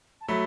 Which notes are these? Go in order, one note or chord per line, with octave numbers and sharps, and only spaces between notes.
A5
F#3 A3 B5